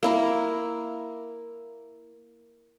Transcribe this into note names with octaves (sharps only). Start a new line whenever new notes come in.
A#3 E4 A#4